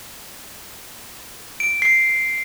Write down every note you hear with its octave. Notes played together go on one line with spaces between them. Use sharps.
D7
C7